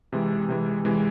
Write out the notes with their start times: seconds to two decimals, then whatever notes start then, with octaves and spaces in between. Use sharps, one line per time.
0.12 C3 E3 G#3
0.49 C3 E3 G#3
0.85 C3 E3 G#3